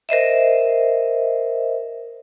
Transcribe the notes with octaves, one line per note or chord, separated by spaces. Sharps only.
A#4 C5 D#5 E5